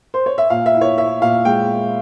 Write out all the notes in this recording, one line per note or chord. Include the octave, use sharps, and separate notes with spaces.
C5
C#5
E5
A#2 F5
E5
E4
C#5
E4 E5
A#2 F5
G#3 G5